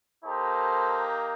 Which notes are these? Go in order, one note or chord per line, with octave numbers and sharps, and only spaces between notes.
A#3 D#4 G4 A4 C5